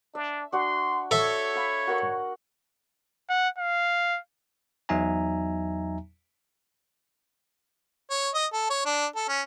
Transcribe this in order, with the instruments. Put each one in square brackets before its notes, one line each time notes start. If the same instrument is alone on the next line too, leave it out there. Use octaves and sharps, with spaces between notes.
[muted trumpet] D4 [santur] E5
[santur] D4 F#4 F#5 [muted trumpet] C6
[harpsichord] A4 E5 [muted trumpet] C#5
[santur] F5 B5
F#4 A#4 F#5
[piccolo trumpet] F#5
F5
[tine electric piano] E2 F#3 D#4 E5 G#5 A#5
[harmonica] C#5
D#5
A4
C#5
D4
A4
C#4